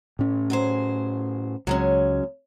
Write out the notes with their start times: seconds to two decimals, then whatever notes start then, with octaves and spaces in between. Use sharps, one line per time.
0.19 A2 C#4
0.50 F#3 G#4 C5
1.67 C#2 F#3 G#3 C#4